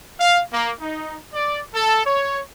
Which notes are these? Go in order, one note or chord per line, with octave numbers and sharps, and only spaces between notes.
F5
A#3
D#4
D5
A4
C#5